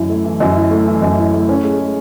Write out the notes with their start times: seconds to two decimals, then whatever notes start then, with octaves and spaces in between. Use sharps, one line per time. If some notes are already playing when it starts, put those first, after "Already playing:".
Already playing: F#2 E3 E4
0.09 A3
0.24 E3
0.40 F#2
0.55 E4
0.71 A3
0.87 E3
1.02 F#2
1.17 E4
1.34 A3
1.49 C#4
1.63 G#3
1.79 G#3